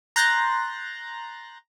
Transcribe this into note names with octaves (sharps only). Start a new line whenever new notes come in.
A#5 C6 F#6 G6 A6 A#6